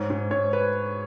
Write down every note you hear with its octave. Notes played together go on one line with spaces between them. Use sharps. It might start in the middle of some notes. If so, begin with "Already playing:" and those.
Already playing: G#2 C#5
G#2
G#2 C#5
B4